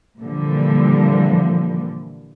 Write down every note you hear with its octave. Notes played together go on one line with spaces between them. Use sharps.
A#2 D3 E3 F3 G3